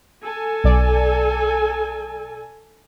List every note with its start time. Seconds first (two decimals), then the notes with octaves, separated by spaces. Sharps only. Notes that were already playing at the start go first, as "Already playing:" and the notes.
0.23 A4 G#5
0.64 B1 D5